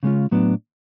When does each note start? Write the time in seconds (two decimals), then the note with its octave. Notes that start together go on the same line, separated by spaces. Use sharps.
0.03 C#3 G#3 C#4 F4
0.31 A2 F#3 B3 D4